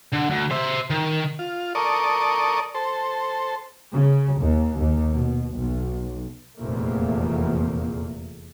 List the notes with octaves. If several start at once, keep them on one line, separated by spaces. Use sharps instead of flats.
D3
D2
C5 E5
D#3
F4
A4 A#4 D5 C#6 D#6
A4 C5
C#3
D#2
D#2
B2
B1
F1 E2 A#2 A3 A#3